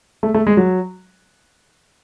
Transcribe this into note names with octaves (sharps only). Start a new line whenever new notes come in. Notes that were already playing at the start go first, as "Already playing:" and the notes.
A3
A3
G#3
F#3